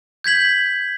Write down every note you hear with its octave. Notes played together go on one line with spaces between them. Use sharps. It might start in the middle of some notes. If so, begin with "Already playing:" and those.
G6 G#6 B6 F#7